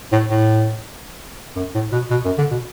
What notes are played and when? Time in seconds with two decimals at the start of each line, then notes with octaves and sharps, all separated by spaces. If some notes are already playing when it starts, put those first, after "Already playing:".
0.12 A2
0.30 A2
1.56 F#2
1.75 A2
1.92 B2
2.11 B2
2.25 F#2
2.38 D3
2.51 B2